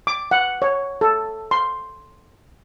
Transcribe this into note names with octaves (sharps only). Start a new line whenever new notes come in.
D6
F#5
C#5
A4
C6